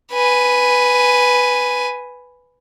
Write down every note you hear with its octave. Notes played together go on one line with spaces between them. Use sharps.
B4 G#5